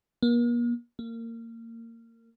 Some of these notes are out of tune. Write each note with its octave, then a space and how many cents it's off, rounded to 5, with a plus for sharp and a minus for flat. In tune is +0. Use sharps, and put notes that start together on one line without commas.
A#3 +40
A#3 -25